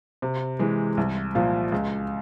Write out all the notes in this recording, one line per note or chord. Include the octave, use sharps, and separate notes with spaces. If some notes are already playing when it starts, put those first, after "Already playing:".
C3
E3 G#3
C2
A#2 F3
C#2